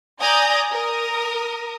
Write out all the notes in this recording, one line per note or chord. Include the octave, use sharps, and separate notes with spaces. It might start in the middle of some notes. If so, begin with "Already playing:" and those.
D5 G#5 A#5 D#6 G6
A#4 D#6